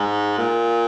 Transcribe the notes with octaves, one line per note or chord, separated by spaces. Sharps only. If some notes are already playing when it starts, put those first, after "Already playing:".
Already playing: G#2
A#2